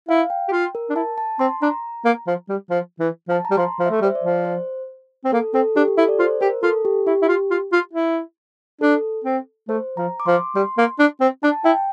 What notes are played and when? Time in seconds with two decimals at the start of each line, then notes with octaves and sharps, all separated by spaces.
0.09 E4 F5
0.30 G5
0.48 G4
0.52 F4
0.75 A#4
0.90 D4
0.95 E4 A5
1.18 A5
1.39 C4 C6
1.62 D4 A#5
2.05 A#3
2.27 F3
2.49 G3
2.70 F3
3.00 E3
3.28 F3 A5
3.45 A#5
3.51 G3
3.57 F3 C6
3.79 F3
3.86 E5
3.90 A3
4.01 G3
4.04 C5
4.15 D5
4.23 F3
4.45 C5
5.24 C4
5.32 A#3 A4
5.54 C4 A4
5.76 D4 G4
5.88 G4
5.97 E4 A4
6.08 D5
6.19 F4 C5
6.41 G4 A#4
6.63 F4 A4
6.85 G4
7.07 E4 G4
7.22 E4
7.28 F4
7.50 F4
7.72 F4
7.94 E4
8.81 D4 A4
9.24 C4
9.69 A3 C5
9.97 F3 A#5
10.20 D6
10.26 F3 C6
10.56 G3 C6
10.78 A#3
10.99 D4
11.21 C4
11.43 D4 A5
11.64 E4 G5